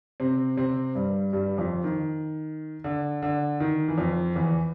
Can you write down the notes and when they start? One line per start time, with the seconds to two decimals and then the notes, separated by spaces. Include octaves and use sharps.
0.20 C3 C4
0.57 C3 C4
0.95 G2 G3
1.33 G2 G3
1.58 F2 F3
1.84 D#3
2.84 D3
3.22 D3
3.60 D#3
3.88 E3
3.98 F2 F3
4.36 E2 E3